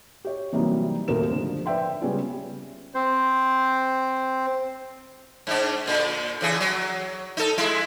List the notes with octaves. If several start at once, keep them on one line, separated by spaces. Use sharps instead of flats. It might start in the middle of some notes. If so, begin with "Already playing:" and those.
G4 C#5
C3 E3 F#3 G3 A#3 D#4
D#2 B2 A3 D#4 A#4 E7
D3 F3
B4 D5 E5 G5 C6
C#3 G3 G#3 B3 C#4 F4
C4 C5
G#2 D4
A#2 D3
C#3 E3 G#4
F#3
D#4 A4
G#3 E4